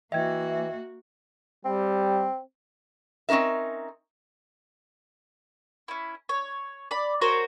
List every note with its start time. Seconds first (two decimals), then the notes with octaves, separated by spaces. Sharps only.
0.12 E3 A#3 F#4 D#5 E5 G5 G#6
1.65 G3 C4
3.29 C4 C#4 D#4 A#4 E5
5.88 C#4 E4
6.29 C#5
6.91 D5 B5
7.21 F#4 A#4 C5 C#5